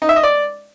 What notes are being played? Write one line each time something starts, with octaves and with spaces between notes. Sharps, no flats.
D#4
E5
D#5
D5